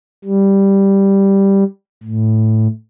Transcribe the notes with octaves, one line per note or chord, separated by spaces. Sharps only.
G3
A2